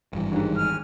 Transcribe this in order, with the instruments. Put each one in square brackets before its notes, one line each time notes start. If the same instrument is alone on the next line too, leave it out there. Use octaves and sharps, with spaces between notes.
[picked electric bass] G#1 G2 E3
[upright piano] D#2 G#2
[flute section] G#5 F6